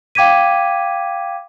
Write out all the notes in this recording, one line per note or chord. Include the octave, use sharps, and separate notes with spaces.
F5 G5 D6 G#6 B6 D#7